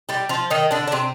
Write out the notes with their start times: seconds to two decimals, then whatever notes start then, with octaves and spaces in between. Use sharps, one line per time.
0.09 G3 G4
0.29 F3 F4
0.50 D#3 D#4
0.71 D3 D4
0.87 D4
0.92 C3 C4